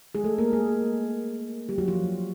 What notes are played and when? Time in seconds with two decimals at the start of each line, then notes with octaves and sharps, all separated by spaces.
0.15 G#3 G#4
0.24 A3 A4
0.38 A#3 A#4
0.53 G#3 G#4
1.69 G3 G4
1.78 F#3 F#4
1.88 F3 F4